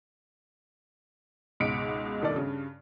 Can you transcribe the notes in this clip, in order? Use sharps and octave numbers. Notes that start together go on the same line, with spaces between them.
C#2 G#2 B2 B6 C#7 D7
B1 G2 D#3 A3 A4 D5
G2 C#3